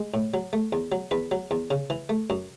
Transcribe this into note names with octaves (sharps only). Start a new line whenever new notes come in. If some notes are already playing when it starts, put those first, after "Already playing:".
Already playing: G#3
A2
F#3
A3
E2
F#3
E2 B4
F#3
E2
C#3
E3
A3
F#2